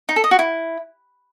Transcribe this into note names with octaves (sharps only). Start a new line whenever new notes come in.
D#4
A4
D#5
F#4
E4